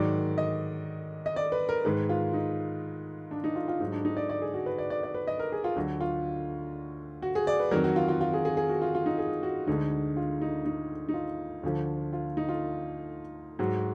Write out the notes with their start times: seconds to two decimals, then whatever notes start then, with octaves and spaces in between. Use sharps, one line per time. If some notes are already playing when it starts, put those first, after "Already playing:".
Already playing: G#2 D#3 F#3 D5
0.38 D#5
1.26 D#5
1.36 D5
1.52 B4
1.69 A#4
1.85 G#2 D#3 G#3 B4
2.09 F4
2.33 D#4
3.31 D4
3.44 D#4
3.56 F4
3.68 F4
3.80 G#2 F#3 D#4
3.92 D4
4.05 D#4
4.17 D5
4.30 D5
4.42 G#4
4.54 F#4
4.66 B4
4.78 D5
4.90 D5
5.03 D5
5.14 B4
5.27 D#5
5.39 A#4
5.52 G#4
5.64 F4
5.76 D2 D3 F#3 F#4
6.01 F4
7.22 F#4
7.35 G#4
7.47 D5
7.60 B4
7.71 F2 D#3 F#3 A#4
7.84 F#4
7.96 F4
8.08 F4
8.21 F4
8.33 G#4
8.45 G#4
8.57 G#4
8.69 F#4
8.82 F4
8.95 F4
9.06 D#4
9.18 G#4
9.43 F#4
9.67 D2 D3 G#3 D#4
10.17 F4
10.42 D#4
10.65 D#4
11.09 D#4
11.14 F4
11.63 D2 D3 F3
12.13 F4
12.37 D#4
12.49 F4
13.59 G#2 F#3 F#4